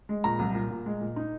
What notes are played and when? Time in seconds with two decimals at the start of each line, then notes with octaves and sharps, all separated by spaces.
0.09 G#3
0.24 A#2 A#5
0.39 C2
0.55 A#2
0.71 A#2
0.86 G#3
1.01 A#2
1.16 D#4